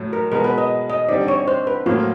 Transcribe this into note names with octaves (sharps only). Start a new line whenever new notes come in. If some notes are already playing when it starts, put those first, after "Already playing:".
Already playing: A2 F#3 A3
A#4
B2 G#3 B3 A#4
B4
D#5
D#5
D3 G3 C4 D#4 D5
C#5
C5
B4
A2 F#3 A#3 F4